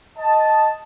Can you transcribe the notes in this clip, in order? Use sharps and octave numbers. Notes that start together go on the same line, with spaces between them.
D#5 A5